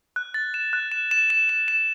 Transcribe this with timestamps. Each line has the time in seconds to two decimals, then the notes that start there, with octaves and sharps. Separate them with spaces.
0.16 F#6
0.34 A6
0.54 E7
0.73 F#6
0.92 E7
1.11 E7
1.30 E7
1.49 E7
1.68 E7